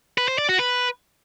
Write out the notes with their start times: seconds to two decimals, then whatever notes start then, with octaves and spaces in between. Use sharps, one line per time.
0.18 B4
0.28 C5
0.38 D5
0.49 F#4
0.59 B4